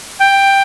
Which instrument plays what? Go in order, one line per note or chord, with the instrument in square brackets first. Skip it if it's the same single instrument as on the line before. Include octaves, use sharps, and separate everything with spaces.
[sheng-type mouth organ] G5